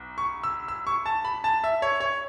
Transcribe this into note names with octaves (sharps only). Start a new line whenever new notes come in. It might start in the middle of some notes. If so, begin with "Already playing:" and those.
Already playing: B1
C#6
E6
E6
C#6
A5
B5
A5
E5
C#5
C#5